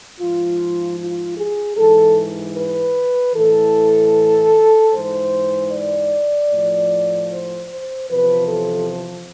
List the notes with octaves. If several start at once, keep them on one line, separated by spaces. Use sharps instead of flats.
G#2 F3 F4
F4
G#4
G#2 E3 A4
B4
A2 E3 A4
G#2 E3 C5
D5
A2 F3
C5
C5
E2 C3 F3 B4
A4